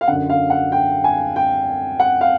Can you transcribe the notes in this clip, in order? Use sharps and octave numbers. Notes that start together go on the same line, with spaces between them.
F5
F#2 D3 F#5
F5
F#5
G5
G#5
G5
F#5
F5